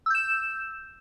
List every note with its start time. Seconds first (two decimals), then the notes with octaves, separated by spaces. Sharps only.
0.06 E6
0.10 G6
0.15 E7